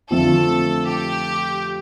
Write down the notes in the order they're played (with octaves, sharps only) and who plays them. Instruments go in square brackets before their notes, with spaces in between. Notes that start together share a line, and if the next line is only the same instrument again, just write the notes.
[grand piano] F2 D3 A3 C4 F4 [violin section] A4
[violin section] G4